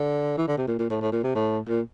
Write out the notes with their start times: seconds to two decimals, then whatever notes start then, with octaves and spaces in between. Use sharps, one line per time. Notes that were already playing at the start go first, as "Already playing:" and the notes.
Already playing: D3
0.38 E3
0.48 D3
0.58 C3
0.68 A#2
0.79 A#2
0.90 A2
1.01 A2
1.12 A#2
1.24 C3
1.35 A2
1.69 A#2